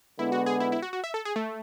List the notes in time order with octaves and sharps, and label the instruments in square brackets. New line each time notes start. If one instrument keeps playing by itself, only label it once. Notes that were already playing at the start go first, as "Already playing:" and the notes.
[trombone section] D3 G#3 B3 [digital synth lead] E4
[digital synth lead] F#4
G#4
E4
E4
F#4
F#4
E5
A4
G#4
A3